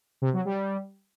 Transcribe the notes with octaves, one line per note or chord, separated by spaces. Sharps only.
C3
F#3
G3